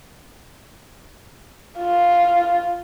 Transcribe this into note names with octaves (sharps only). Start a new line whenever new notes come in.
F4